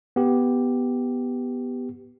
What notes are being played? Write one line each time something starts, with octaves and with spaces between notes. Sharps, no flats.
B3 G4